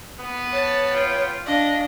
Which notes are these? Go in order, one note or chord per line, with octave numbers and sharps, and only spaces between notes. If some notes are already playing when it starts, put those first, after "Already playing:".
B3
C#5 A5
F4 G5
D4 D#5 F5